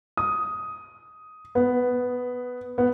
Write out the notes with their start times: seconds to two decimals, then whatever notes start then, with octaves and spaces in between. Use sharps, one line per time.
0.17 D#6
1.55 B3
2.78 B3